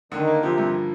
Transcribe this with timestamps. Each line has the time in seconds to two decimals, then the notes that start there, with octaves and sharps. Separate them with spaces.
0.12 D3 D#3
0.27 A#3
0.42 C3 F3
0.58 G2